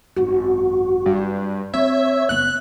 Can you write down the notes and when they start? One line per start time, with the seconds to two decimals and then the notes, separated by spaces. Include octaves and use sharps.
0.16 G#1 F#2 F#4
1.06 G2
1.74 C4 C#5 E5
2.29 F#1 B3 F#6